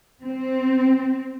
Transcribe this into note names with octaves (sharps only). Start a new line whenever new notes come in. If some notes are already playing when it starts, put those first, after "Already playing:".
C4